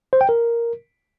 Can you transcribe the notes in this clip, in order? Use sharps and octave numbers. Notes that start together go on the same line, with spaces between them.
C5
G5
A#4